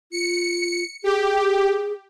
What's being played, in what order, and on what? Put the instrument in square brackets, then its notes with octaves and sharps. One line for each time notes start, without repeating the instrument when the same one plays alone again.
[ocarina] F4 [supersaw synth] C#7
[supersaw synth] G4 [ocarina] G#4